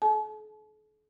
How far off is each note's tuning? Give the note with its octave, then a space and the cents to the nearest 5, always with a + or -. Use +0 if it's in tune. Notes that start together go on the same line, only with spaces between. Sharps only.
A4 -45 A5 -45